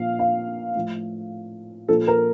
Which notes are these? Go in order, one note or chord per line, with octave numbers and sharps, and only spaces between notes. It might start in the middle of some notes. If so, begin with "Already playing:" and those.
Already playing: A#2 F3 F5
F5
A2 F3
A#2 F3 A4
A#4